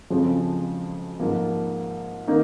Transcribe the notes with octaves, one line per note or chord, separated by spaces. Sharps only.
F2 C#3 F3 G#3 C4
G#2 F3 A#3
D#3 A#3 D#4